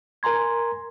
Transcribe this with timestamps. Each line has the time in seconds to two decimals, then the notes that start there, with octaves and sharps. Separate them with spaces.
0.23 A#4 G#5 A#5 C6 G#6